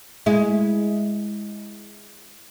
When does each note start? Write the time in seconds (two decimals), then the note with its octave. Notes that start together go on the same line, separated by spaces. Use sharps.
0.26 G#3 E4